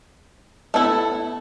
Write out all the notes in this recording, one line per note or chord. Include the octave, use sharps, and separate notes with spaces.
A3 B3 E4 A4